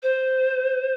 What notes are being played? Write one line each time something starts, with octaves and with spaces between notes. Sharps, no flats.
C5